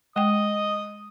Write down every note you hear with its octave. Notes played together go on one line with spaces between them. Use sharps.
G#3 D#5 G5 D#6